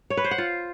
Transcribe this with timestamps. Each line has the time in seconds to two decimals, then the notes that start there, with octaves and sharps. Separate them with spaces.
0.10 C#5
0.17 B4
0.24 C5
0.31 F#5
0.38 F4